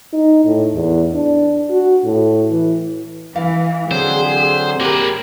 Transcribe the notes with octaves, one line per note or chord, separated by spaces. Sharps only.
D#4
A2
E2
D4
F#4
A2
E3
E3 F5
D3 F#3 C4 G#4 C5
A#3 G4 A#4 B4